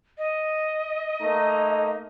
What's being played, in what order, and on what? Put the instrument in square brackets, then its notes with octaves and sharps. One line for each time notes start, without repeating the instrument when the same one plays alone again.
[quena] D#5
[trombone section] A3 A#3 D#4